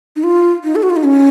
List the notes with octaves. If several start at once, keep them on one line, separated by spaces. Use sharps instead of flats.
D#4
F4
D#4
A4
F#4
F4
D#4
C#4